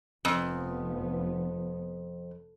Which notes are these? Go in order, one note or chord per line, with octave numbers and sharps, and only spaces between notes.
F1 F2 F3 B3